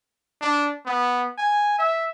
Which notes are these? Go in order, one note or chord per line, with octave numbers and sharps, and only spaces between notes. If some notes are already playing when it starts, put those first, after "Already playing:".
D4
B3
G#5
E5